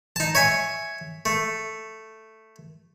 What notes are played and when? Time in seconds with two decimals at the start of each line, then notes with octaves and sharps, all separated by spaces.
0.16 D#4 A5
0.35 C#5 E5 G#5
1.26 A3